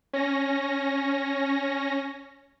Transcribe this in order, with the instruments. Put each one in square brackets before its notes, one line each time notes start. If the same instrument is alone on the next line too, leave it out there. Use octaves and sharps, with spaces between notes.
[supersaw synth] C#4 A#6